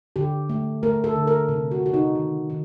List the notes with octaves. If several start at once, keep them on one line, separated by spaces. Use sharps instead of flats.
D3 G4
A3
A3 A#4
A4
D3
A#4
C3
F#4
C3 F#4
D#4
D#3
D#3